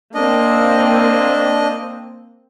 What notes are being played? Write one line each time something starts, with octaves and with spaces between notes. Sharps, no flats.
A#3 C4 D4 D#5